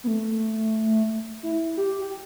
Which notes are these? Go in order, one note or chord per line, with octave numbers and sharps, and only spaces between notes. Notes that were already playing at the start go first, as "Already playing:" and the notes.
B3
A3
E4
G4
G4